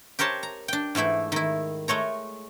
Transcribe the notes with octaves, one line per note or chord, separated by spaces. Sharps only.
G4 A#4 C5 C#5 A5
A#5
D4 G5
G#2 E3 A3 E4
D#3 E4
G#3 A3 C#5 A#5